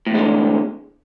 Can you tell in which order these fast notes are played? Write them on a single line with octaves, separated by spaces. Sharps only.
A2 E2 G#3 D3